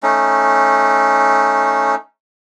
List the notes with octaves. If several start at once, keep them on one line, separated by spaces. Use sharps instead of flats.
A3 C#4 D#4